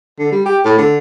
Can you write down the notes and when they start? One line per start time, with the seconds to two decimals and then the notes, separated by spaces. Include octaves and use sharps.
0.19 D3
0.32 G3
0.45 G4
0.65 A2
0.78 D3